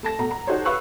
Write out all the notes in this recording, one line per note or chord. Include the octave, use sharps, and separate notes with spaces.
A3 A5 A#6
B2 A3 A#5
A#5
D#4 F#4 G4 A4 C5 C#5
B4 F5 C#6 E6 F#6